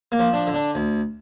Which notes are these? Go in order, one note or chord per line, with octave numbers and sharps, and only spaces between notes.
A#3
F3
D4
D3
D4
D2